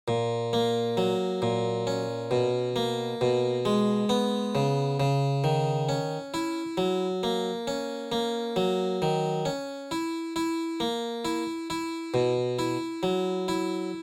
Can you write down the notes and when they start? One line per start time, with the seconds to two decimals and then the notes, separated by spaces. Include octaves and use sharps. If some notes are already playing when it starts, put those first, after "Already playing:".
0.08 A#2
0.53 A#3
0.97 F#3
1.42 A#2
1.87 C#4
2.31 B2
2.76 A#3
3.21 B2
3.65 G#3
4.09 B3
4.55 C#3
5.00 C#3
5.44 D#3
5.89 C#4
6.34 E4
6.77 F#3
7.23 A#3
7.67 C#4
8.12 A#3
8.56 F#3
9.02 D#3
9.45 C#4
9.91 E4
10.36 E4
10.80 A#3
11.25 E4
11.70 E4
12.14 B2
12.59 E4
13.03 F#3
13.48 E4